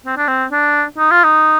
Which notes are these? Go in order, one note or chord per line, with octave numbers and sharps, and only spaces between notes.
C4
D4
C4
D4
D#4
F4
D#4